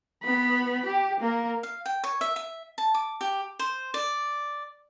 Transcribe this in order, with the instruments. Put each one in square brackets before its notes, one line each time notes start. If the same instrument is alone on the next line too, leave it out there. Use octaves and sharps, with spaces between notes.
[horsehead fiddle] B3 B5
G4
A#3 A#4
[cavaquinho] F5
G5
C#5
E5
E5
A5
D6
G4
C5
D5